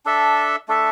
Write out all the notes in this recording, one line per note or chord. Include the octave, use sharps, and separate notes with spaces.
D4 A4 E5
A3 D4 A4 E5